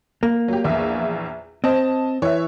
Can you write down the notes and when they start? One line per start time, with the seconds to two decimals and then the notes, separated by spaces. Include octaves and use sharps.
0.23 A#3
0.48 F#3 G4
0.64 A#1 E2 E5
1.64 C4 D#5 A5
2.22 E3 C#5 E5